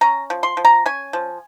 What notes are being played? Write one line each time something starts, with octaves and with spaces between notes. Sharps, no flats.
C#4 A#5
F3
C6
F3
A#5
C#4 G#5
F3